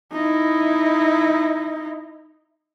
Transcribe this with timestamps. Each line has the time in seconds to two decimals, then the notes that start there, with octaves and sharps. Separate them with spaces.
0.13 D#4 E4